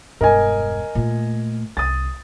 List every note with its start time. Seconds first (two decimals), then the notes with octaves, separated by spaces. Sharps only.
0.21 E1 G2 A#4 D#5 G#5
0.95 A#2 A3
1.77 C2 D#6 A6